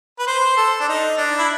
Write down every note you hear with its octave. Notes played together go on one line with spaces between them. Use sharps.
B4
C5
A4
D4
D#4
D4
E4